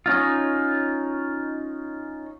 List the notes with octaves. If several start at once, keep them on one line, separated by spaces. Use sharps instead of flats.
C#4 D#4 F4